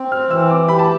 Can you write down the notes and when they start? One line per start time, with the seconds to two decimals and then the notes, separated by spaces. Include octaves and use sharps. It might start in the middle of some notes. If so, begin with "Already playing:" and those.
Already playing: C4
0.12 F6
0.30 E3 E6
0.50 D6
0.68 G4 B5
0.79 A5